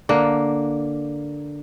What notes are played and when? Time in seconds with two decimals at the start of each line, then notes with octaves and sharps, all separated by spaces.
0.09 D3 A#3